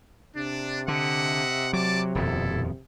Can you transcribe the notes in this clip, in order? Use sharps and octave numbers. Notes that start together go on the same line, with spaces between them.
C3 D4
D3 D#5 E5 F#5
F#3 D5 A5 D6
D#1 F2 B2 E4 A4